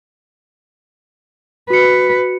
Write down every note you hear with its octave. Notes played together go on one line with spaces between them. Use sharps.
F#4 B4 C#7